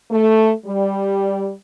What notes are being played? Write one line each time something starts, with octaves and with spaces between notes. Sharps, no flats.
A3
G3